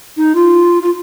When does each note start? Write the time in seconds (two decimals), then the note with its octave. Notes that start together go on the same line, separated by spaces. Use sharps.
0.17 D#4
0.35 F4
0.82 F4